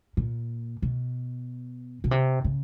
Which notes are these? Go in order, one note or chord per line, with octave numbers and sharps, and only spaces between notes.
A#2
B2
B2
C3
C#3